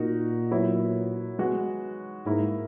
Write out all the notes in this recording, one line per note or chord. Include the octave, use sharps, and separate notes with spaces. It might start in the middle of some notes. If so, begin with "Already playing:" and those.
Already playing: A#2 D#4 F#4 A#4
F#3 B3 E4
G#3 B3 F#4
G#2 A#3 E4 A#4